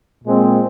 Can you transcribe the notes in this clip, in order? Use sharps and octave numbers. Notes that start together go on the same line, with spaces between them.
A#2 G#3 C4